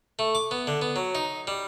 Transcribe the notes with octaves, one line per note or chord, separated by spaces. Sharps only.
A3
D6
B3
D3
B3
F#3
D#4
G3